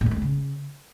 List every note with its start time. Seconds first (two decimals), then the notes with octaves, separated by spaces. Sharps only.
0.01 A#2
0.06 F#2
0.11 G3
0.16 G#3
0.22 C#3